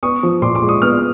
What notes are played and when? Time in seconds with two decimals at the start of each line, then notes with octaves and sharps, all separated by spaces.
0.03 B3 C#6 D#6
0.23 F3
0.42 A#2 C6 D6
0.55 C6 D6
0.62 G#3
0.69 C#6 D#6
0.82 B3 D#6 F6